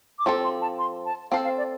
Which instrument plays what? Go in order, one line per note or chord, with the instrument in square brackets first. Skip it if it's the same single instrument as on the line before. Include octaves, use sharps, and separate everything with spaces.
[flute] D6
[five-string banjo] F3 C4 A4 [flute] C6
[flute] C6
A5
C6
A5
[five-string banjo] C4 A4 C5 [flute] F5
[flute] F5
D5